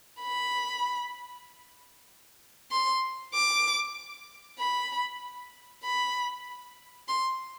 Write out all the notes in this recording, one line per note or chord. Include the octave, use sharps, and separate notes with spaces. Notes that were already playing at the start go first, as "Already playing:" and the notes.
B5
C6
D6
B5
B5
C6